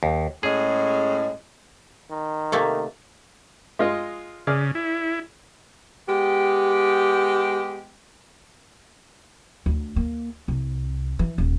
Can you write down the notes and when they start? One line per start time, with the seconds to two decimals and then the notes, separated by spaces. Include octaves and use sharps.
0.03 D#2
0.43 A2 G#3 C#4 G#4
2.11 D#3
2.52 C3 A3 A#3
3.79 G#3 F4 D#5
4.47 C#3 G#4 D5 F6
4.75 E4
6.09 G#3 B3 G4
9.66 D2
9.96 A#3
10.48 C2
11.19 E3
11.38 D#1